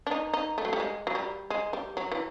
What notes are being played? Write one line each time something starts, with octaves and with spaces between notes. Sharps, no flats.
D4
D#4
D#4
A3
F#3
G3
G#3
F#3
G3
G#3
G3
F#3
E3